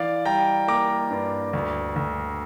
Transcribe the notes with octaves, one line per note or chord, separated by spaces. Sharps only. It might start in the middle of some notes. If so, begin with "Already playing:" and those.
Already playing: E3 D5 F5
G3 G5 A#5
A#3 A#5 D6
G2
D2
D2